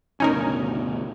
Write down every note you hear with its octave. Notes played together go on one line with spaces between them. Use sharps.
F#1 D2 B2 C#4 D#4 A#4